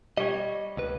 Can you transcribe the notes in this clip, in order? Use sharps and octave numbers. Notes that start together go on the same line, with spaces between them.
G3 C#5 D#5
C#2 B4